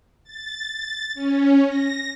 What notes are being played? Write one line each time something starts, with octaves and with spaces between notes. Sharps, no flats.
A6
C#4
A#6